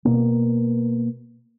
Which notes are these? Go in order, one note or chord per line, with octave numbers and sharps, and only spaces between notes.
B2 A#3